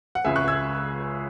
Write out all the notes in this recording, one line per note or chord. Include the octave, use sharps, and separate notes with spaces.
F#5
C#2 C#3 G#3 E5 G#5
C#6 F#6
E6 G#6